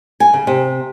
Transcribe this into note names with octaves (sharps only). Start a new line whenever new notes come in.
G#5
C#3
C3